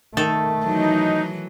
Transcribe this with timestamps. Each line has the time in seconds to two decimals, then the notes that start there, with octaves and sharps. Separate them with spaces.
0.17 D#3 A3 A4
0.65 E3 F#3 D#4